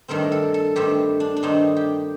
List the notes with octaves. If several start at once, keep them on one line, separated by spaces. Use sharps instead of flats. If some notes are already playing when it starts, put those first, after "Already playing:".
G2 D#3 A3 C4 A#4
A4
A4
G2 D#3 A3 C4 G4
D4
D4
G2 D#3 A3 C4 D#4
G4